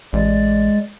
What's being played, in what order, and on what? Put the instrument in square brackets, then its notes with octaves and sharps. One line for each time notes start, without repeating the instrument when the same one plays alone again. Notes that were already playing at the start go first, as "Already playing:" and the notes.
[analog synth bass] A1 [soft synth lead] G#3 [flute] D5